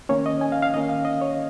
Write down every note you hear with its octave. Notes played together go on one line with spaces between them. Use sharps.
D#3 A#3 C#4 C#5
D#5
G#5
F5
F5
D#3 A#3 C#4 D#5
F5
D#5
C#5